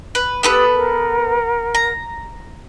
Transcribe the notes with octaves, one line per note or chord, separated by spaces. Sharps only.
B4
B3 G4 A4 B4 B5 D#6
A#4 F#5
A#5